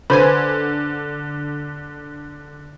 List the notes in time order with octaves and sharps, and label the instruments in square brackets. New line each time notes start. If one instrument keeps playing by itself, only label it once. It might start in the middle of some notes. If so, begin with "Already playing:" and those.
[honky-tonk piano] D3 [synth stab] B4 C5 G#5